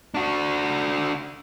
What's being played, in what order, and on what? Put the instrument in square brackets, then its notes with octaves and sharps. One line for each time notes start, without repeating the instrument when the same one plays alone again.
[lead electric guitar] D4 F#4